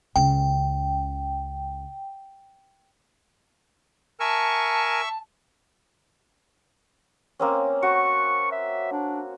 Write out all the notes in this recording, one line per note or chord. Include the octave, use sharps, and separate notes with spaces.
C#2 C#3 G5
A#4 E5 G#5 A5 C#6
A#3 C4 C#4
F#4 C#6
E5
D4